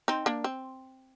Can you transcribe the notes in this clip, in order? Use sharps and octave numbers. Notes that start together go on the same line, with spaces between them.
C4 D#4
A#3 D4
C4